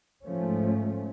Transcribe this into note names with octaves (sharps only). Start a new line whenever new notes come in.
G#2 F3 A3 C#4